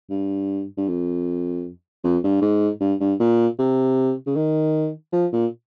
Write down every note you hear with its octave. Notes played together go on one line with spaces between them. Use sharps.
G2
G2
F2
F2
G2
G#2
G2
G2
A#2
C3
C#3
D#3
F3
A#2